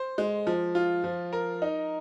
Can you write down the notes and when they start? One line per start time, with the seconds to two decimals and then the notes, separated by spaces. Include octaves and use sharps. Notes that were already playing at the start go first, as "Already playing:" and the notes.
Already playing: C5
0.18 G#3
0.47 F3
0.75 F4
1.04 F3
1.33 A#4
1.62 D#4